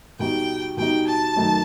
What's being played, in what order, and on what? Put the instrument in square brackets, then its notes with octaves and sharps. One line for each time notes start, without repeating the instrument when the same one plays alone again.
[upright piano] B2 G3 D#4 [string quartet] G5
[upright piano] B2 G3 D#4 [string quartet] G5
[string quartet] A5
[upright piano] F#2 D#3 A3 D#4